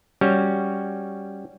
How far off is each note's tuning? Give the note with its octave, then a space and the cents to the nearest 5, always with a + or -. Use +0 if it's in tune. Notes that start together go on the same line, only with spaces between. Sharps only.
G3 +0 C#4 +0 F#4 +0